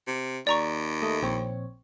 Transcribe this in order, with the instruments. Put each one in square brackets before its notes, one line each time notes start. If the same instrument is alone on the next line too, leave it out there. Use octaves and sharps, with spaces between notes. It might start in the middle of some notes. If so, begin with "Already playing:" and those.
[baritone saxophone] C3
[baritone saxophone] D#2 [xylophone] D5 A#5 C#6
[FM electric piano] A3 D#5
A#1 C4 C#5